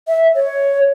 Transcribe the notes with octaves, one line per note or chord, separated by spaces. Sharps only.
E5
C#5